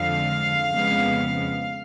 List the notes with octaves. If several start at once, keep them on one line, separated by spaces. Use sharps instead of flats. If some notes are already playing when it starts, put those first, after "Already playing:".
Already playing: F2 D3 F3 G#3 F5
F2 C#3 G#3 B3